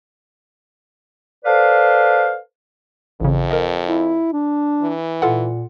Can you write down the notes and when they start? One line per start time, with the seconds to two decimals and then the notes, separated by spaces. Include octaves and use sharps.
1.45 A4 B4 C5 D5 F5
3.20 A1 F2 C#3
3.51 A#4 D#5
3.86 E4
4.33 D4
4.82 E3
5.22 A#2 F4 A4 F#5